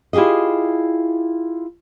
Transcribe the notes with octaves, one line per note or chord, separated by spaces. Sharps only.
E4 F4 G4 G#4 D#5